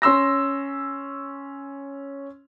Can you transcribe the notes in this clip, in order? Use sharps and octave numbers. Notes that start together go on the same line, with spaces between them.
C#4 C6 E6 A#6